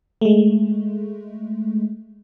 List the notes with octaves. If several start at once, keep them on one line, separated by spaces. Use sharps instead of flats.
G#3 A3